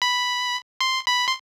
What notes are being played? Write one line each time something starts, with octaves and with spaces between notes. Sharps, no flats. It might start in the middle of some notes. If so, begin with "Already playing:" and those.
B5
C6
B5
C6